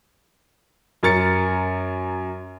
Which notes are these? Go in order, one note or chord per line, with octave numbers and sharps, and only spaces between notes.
F#2 A#4 A6 C#7